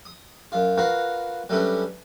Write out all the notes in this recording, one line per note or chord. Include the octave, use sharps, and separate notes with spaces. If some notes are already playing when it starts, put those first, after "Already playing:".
D#6
F#2 F4
F4 F#4 A#4 B4 F5 F#5
F#3 G3 A3 C#4 D4 B4